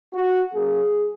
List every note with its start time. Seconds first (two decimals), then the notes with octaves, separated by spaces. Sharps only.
0.14 F#4
0.54 F#3 A#3 C#4 G#4